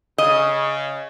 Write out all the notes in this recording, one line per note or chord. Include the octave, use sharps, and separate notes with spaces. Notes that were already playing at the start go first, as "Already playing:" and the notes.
C#3 D#5